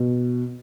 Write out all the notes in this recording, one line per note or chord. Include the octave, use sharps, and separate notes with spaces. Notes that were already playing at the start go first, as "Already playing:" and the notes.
Already playing: B2